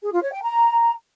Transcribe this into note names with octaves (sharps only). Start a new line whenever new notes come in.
G#4
F4
C#5
G5
A#5